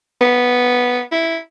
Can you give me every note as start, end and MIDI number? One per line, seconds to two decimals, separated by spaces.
0.21 1.00 59
1.12 1.36 64